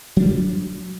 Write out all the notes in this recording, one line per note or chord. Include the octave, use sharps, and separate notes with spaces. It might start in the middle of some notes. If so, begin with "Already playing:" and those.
F#3 G3 D4